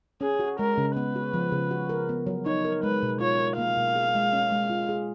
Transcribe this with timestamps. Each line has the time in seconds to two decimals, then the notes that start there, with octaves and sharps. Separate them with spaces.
0.21 C#4 G#4
0.39 F#4
0.59 G#3 A#4
0.78 C#3
0.96 B3 B4
1.15 F#4
1.34 F3
1.52 C#3
1.71 F#4
1.89 A#4
2.09 B3
2.27 F#3
2.46 D#4 C#5
2.65 A#4
2.83 G#3 B4
3.03 B2
3.21 F4 C#5
3.40 A#4
3.58 A#3 F5
3.77 B2
3.95 G#4
4.15 G#3
4.33 C#4
4.51 G#3
4.70 F4
4.89 G#4